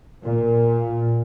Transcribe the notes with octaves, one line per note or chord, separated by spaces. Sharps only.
A#2